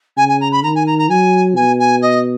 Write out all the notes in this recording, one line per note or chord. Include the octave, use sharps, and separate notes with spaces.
C#3 G#5
G#5
A#5
B5
D#3 A#5
G#5
A#5
A#5
F#3 G#5
B2 G#5
G#5
D#5